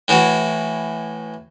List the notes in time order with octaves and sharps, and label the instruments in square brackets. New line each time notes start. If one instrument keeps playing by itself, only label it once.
[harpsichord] A2 E3 F#4